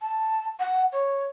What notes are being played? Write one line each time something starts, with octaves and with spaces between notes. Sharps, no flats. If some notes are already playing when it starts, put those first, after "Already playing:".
A5
F#5
C#5